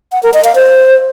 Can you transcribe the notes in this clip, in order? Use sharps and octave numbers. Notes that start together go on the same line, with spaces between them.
F#5
A#4
D#5
F5
C5